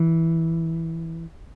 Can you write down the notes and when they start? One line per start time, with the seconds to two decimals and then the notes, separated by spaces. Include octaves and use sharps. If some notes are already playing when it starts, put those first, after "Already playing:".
Already playing: E3